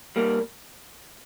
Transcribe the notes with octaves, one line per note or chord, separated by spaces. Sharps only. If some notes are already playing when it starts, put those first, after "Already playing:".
G3 A#3